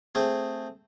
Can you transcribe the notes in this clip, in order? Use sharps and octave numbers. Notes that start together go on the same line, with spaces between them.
A3 C4 G#4